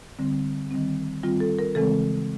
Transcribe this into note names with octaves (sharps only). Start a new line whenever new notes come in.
D3 G3 C4
D#3 G3 C4
D#3 G3 C4 F4
A4
A#4
C#3 E3 G#3 C4 A4